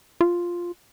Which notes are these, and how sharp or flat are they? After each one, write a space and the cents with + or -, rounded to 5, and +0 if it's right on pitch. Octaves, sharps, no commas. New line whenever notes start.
F4 +0